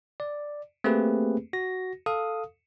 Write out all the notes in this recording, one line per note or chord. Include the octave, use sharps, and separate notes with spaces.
D5
A3 A#3 C4 G4 G#4 B4
F#4 A#6
A4 F5 D#6